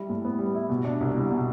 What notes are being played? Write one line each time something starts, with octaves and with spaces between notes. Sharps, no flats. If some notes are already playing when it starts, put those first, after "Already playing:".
Already playing: G3 E4
A2
B3
G3
E4
B2
D4
C2
G3
B2